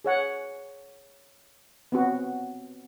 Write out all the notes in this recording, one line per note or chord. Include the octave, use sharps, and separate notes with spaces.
G#4 C#5 F#5
B3 C4 F#4